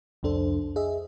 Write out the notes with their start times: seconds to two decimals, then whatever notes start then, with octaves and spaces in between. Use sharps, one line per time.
0.23 C2 F2 D4 A4 C5
0.76 G#4 D#5 E5